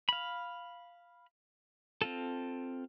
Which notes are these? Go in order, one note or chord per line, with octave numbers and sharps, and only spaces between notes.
F5 B5
C4 F4 A4